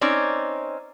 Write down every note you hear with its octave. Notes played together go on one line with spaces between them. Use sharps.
C4 C#4 D#4 D5